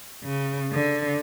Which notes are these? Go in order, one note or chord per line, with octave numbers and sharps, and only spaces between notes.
C#3
D3